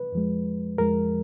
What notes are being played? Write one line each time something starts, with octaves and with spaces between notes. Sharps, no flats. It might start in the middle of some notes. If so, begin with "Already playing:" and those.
Already playing: B4
F2 F3 G#3
F2 F3 G#3 A#4